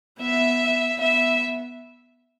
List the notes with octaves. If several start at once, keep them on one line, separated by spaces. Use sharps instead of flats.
B3 E5
B3 E5